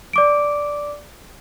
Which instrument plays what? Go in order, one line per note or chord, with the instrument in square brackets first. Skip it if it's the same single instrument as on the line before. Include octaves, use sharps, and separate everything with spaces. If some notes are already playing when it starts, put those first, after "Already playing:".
[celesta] D5 D6 D7